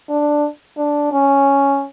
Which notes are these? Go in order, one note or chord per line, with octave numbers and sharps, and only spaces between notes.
D4
D4
C#4